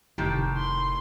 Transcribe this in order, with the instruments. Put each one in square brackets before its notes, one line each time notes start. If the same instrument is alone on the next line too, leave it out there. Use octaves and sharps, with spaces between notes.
[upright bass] F1 [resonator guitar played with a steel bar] A2 D#3 G4
[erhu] C6